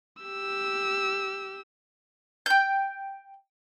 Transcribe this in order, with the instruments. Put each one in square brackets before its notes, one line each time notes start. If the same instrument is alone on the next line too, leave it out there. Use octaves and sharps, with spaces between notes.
[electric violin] G4 E6
[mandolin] G5 G6